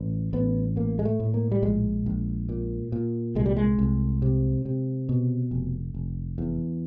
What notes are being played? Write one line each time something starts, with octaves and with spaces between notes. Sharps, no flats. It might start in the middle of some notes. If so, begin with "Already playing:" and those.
Already playing: A1
A1 B3
A2 A#3
G#3
A3
A2
A#3
G3
A#1 G#3
A#1
A#2
A#2
C2 G#3
G3
G#3
C2
C3
C3
B2
F1
F1
E2